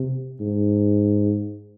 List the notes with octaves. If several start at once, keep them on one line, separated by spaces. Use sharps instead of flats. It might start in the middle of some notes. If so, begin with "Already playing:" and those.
Already playing: C3
G#2